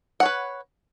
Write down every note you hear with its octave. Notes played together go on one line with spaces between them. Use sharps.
B4 C#5 F#5